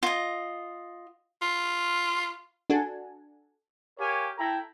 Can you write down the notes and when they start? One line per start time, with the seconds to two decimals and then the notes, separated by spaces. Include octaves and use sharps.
0.03 F4 D#5
1.42 F4
2.70 D4 F#4 A4 G#5
3.98 G4 A#4 C#5 F5 G#5
4.38 E4 A4 G5 A#5